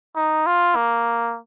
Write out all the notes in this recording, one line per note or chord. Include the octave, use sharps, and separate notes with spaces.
D#4
F4
A#3